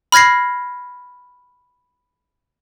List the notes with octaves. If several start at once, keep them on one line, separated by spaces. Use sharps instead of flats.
B5 F6 G#6 A#6 C7